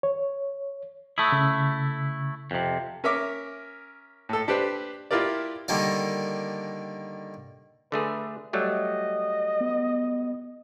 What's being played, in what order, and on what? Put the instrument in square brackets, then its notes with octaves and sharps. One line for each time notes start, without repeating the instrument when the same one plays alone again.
[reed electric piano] C#5
[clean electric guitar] A3 E4 [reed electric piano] D#6
[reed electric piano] C#3
[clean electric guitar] F2 C3
[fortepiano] C#4 A#4 E5 D6
A2 A4
D4 G4 B4 C5
E4 F4 G4 A#4 D5
[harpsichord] D3 D#3 G3 A#3 D4 F5
[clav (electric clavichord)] D3 A3 G#4 [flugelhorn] B4
[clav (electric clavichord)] F#3 G3 A3 [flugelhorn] D#5
[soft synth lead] B3